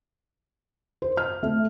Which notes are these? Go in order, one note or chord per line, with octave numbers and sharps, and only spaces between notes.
C5
F6
A3